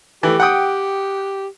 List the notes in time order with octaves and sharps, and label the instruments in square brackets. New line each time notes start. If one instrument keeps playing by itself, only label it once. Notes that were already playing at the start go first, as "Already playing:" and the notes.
[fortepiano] E3 A3 [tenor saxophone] G4
[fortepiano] F#5 G5 D#6